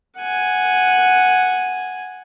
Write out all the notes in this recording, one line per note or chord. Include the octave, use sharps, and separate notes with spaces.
F#5 G#5